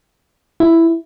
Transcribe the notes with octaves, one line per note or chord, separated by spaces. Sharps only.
E4